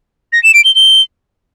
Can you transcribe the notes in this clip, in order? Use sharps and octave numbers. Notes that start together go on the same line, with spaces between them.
A#6
E7
D7
G7
G7